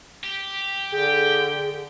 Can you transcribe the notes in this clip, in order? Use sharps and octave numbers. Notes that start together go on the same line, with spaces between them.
G4
D3 G#4 G5